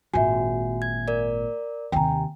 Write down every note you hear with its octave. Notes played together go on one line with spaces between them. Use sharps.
G#1 A#2 F#4 E5 G#5
G#6
A#4 D5
D#2 C3 G5 G#5 A#5